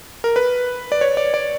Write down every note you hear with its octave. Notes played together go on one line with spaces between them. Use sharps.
A#4
B4
D5
C#5
D5
D5